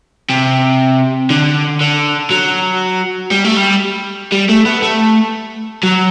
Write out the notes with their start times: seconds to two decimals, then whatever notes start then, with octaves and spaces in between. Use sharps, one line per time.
0.29 C3
1.30 D3
1.81 D3
2.30 F#3
3.31 G3
3.44 A3
3.57 G3
4.32 G3
4.49 A3
4.65 B3
4.83 A3
5.83 F#3